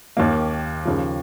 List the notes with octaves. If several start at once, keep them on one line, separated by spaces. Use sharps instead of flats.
D#2 D#3 A#3
D#2 C#3 F3